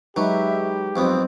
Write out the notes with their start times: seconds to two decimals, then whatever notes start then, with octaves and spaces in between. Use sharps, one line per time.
0.16 F#3 G#3 D#4 G4 B4 E5
0.96 B1 F2 B3 C4